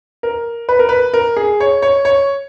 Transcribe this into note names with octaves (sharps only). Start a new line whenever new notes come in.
A#4
B4
A#4
B4
A#4
G#4
C#5
C#5
C#5